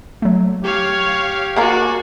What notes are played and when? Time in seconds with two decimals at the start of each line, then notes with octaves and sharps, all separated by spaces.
0.22 F#3 A3
0.64 G4 C#5 F5
1.56 A#3 F#4 G#4 A#4 D5